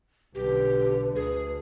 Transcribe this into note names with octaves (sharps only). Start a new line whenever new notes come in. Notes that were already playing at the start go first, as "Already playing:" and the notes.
B1 D3 G4 B4
D2 G#4